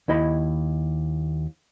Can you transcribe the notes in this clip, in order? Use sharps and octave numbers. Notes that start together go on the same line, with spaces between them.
D#2 E4 D#5 B5